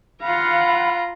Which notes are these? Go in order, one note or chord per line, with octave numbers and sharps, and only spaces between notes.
F4 F5 F#5 A#5 B5